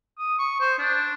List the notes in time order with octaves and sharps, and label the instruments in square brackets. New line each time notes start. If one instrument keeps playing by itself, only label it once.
[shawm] D#6
C#6
C5
D4